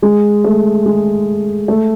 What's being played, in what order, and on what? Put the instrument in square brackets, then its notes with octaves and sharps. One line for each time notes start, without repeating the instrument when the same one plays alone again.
[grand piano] G#3
A3
G#3
A3